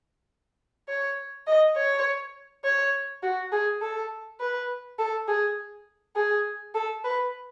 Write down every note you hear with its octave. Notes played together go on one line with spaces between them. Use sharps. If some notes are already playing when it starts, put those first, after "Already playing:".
C#5
D#5
C#5
C#5
F#4
G#4
A4
B4
A4
G#4
G#4
A4
B4